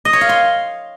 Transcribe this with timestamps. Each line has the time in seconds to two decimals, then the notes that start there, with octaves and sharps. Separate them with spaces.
0.05 D#5
0.13 C#5
0.21 F5
0.29 C6